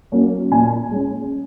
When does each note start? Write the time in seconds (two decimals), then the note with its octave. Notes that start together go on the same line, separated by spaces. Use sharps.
0.12 F#3 A#3 C#4
0.51 A#2 G#5
0.91 G#3 C#4